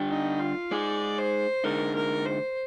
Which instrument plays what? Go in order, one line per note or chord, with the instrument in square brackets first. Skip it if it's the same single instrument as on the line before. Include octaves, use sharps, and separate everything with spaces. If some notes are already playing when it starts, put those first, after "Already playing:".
Already playing: [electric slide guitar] D3 G3 D4 G4
[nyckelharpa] D#4
F4
[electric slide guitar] G#3 D#4 G#4 [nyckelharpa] D5
[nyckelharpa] C5
[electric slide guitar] D3 G#3 D#4 [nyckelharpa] A#4
[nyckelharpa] A#4
C5